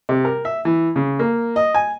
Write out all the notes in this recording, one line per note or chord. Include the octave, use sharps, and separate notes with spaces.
C3
A#4
E5
E3
C#3
A#3
D#5
G#5